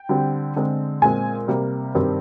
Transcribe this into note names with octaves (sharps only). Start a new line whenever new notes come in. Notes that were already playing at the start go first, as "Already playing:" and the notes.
Already playing: G5
D3 G3 C4
D3 G#3 C4
A#2 G#3 C4 G#5
C3 G3 A#3
G2 D#3 G3 C4